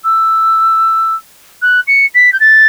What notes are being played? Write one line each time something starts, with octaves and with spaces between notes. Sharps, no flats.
E6
F#6
C#7
B6
G6
A6